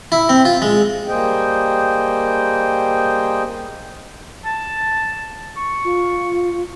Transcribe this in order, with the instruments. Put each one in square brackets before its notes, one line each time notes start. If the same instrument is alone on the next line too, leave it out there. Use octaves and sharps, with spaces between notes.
[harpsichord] E4
C4
F4
G#3
[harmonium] G3 A#3 G#4 C5 D#5 G5
[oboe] A5
C#6
[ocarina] F4